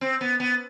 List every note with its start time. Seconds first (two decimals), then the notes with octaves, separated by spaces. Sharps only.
0.01 C4
0.21 B3
0.40 B3